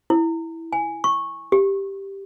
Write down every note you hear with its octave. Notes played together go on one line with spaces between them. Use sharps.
E4
G#5
C#6
G4